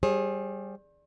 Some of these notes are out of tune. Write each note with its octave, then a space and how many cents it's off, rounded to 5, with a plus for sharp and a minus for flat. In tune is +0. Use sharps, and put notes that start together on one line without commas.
G3 +0 G#4 +0 C5 +45